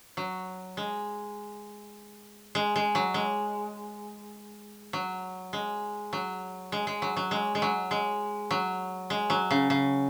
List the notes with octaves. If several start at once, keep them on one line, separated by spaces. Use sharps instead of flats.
F#3
G#3
G#3
G#3
F#3
G#3
F#3
G#3
F#3
G#3
G#3
F#3
F#3
G#3
G#3
F#3
G#3
F#3
G#3
F#3
C#3
C#3